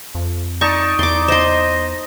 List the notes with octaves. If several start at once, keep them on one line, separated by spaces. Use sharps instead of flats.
F2
D#4 D5 A5 C#6
E2 C6 D6
C5 D#5 C6